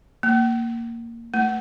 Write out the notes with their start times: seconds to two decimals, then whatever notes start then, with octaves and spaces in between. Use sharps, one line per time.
0.23 A#3
1.34 A3